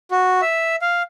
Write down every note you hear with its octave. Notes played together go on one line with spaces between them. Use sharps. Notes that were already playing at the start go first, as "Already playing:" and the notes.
F#4
E5
F5